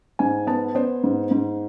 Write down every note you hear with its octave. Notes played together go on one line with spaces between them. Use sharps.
G#2 G#5
B3 A5
B3 C5
G#2
G#2